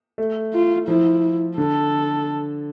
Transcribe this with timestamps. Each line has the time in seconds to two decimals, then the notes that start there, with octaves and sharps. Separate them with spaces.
0.18 A3
0.54 F4
0.88 F3 E4
1.57 D3 A4